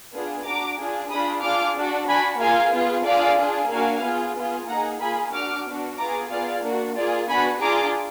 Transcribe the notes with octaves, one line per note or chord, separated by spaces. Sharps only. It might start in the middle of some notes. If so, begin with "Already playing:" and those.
B3 D4 F4 G#4
D4 F#4 A#5 D6
D4 F4 G#4
D4 F4 G#4 B5 D#6
D4 F4 G#4 D6 F6
D4 F#4
D4 F#4 G#5 B5
A#3 F4 G#4 F5 G#5
B3 F4 G#4
D4 F4 G#4 D5 F5
D4 F4 G#4
A#3 D4 F#4 F5 G#5
B3 F4 G#4
B3 F4 G#4
A#3 D#4 G#4 F#5 A#5
A#3 F4 G#4 G#5 B5
D4 F#4 D6 F6
B3 D4 F#4
B3 F4 G#4 A#5 D6
B3 F4 G#4 D5 F5
A#3 D4 F#4
A#3 F4 G#4 D5
B3 D4 F#4 G#5 B5
D4 F4 G#4 A#5 D6